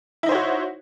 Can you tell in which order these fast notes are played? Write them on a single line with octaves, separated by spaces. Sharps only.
E4 D#4 C5 C#5 F#4